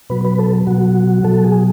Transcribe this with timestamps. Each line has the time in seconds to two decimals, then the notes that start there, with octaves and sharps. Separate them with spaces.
0.10 B2 F#3 B4
0.25 B4
0.39 A4
0.67 B2 F#3 F#4
1.24 B2 F#3 A4
1.43 G#4